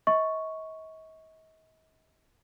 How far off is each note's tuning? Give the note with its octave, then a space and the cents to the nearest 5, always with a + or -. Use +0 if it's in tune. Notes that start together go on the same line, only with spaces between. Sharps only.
D#5 +40 C#6 +0